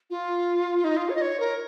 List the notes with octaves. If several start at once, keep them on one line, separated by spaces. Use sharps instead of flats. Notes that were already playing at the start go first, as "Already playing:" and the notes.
F4
D#4
F4
C#5
D#5
C#5
A#4